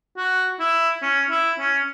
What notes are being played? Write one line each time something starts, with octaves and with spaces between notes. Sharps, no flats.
F#4
E4
C#4
E4
C#4